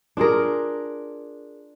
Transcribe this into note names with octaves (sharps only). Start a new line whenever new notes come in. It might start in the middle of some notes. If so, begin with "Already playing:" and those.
D4 F4 G#4 A#4